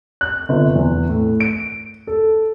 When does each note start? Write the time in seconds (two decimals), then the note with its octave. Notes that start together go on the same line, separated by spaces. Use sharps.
0.21 F#6
0.49 G1
0.76 E2
1.09 A2
1.40 D7
2.07 A4